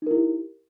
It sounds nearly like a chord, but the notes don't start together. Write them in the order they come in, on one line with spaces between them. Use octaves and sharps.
D#4 A#4 E4 G4